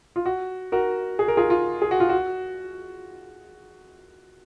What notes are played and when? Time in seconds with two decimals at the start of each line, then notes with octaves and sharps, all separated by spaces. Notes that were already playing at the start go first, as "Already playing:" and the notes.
0.16 F4
0.26 F#4
0.72 F#4 A#4
1.19 G#4
1.28 A#4
1.37 F4 G#4
1.50 F4
1.82 G#4
1.91 F#4
2.00 F4
2.09 F#4